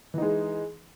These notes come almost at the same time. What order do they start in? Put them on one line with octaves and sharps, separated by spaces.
E3 D#4 G#3